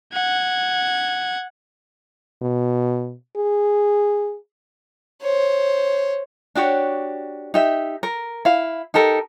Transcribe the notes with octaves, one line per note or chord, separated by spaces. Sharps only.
F#5 G#6
B2
G#4
C5 C#5
D4 F#4 G4 C#5
D#4 G4 E5
A#4
E4 F5
D#4 G4 A4 A#4